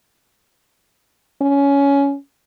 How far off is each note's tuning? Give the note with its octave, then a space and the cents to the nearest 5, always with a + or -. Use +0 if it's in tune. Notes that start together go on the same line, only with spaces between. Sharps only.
C#4 +15